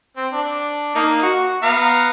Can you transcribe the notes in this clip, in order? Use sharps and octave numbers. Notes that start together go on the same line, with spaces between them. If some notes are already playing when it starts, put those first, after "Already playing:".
C4
D4
A#3 D#4
F#4
B3 F5 A#5